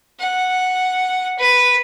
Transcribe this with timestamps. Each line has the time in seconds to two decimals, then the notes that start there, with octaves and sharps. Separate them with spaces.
0.20 F#5
1.39 B4